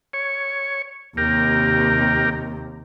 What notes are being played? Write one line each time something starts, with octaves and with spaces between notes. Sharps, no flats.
C#5
D#2 C3 G4 A#4